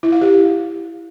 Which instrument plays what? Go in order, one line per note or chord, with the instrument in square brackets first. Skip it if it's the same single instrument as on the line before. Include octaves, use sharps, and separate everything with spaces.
[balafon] E4
F5
G4